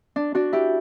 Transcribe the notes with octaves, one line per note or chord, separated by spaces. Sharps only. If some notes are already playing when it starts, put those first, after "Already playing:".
D4
D4 F#4
E4 G4